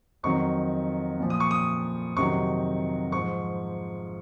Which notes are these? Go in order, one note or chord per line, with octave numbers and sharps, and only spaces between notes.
F2 D#3 F#3 C#6
A#2 F3
D#6
C#6
D#6
F2 C3 D#3 F#3 C#6
G#2 F3 C#6